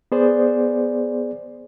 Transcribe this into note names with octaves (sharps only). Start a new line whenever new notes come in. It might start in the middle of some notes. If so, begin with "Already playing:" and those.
B3 G#4 C5 D5